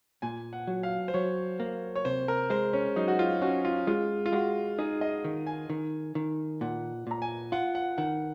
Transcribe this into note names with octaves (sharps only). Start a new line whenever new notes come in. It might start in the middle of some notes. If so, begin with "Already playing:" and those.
A#2 G#5
F#5
F#3
F5
C5
F#3 C#5
A#3
C#5
C3 C5
A#4
G#3 C5
C#4
F#3 D#4
F#4
F4
C#4 F#4
F4
G#3 F4
F4
G#3 F#4
D#4 G#4
D#5
D#3
G#5
D#3
D#3
A#2 F#5
A#2 A#5
G#5
F4 F#5
F#5
D#3 F#5